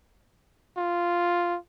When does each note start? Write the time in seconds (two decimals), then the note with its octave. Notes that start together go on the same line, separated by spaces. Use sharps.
0.77 F4